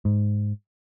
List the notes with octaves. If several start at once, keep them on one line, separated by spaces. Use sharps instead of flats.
G#2